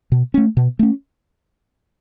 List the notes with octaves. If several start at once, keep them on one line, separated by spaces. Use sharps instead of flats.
B2
A3 C#4
B2
A3 C#4